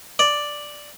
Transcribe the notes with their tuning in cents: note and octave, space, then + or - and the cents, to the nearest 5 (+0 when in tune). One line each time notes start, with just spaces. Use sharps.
D5 +0